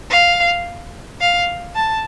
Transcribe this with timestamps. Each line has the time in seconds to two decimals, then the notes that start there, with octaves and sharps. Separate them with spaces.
0.10 F5
1.21 F5
1.76 A5